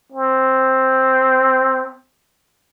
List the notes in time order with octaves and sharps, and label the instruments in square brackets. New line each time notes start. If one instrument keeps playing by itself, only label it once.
[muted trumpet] C4